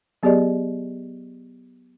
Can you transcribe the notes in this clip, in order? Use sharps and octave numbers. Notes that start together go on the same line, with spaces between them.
F#3 B3 G4 G#4 D5 D#5